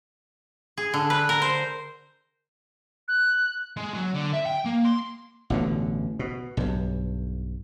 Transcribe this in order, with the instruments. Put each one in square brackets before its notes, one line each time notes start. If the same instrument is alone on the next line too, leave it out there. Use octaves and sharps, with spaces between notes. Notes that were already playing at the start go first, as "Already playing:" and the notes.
[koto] G#4
D3
B4
A#4
C5
[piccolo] F#6
[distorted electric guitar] G#3
F#3
D3
E5
G5
A#3
C6
[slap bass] A1 B2 D3
B2
B1 G2